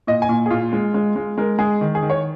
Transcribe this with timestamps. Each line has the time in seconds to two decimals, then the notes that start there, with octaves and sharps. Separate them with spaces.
0.07 A#2 D#5
0.22 G#5
0.29 A#2
0.46 G#4
0.50 A#2 F4
0.73 G#3
0.94 G#3
1.16 G#3
1.38 G#3 A#4
1.59 G#3 G#4
1.81 D#3
1.95 G#4
2.03 D#3
2.10 C#5